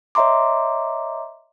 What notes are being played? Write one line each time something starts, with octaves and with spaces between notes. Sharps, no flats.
C#5 D#5 E5 A#5 C6 D6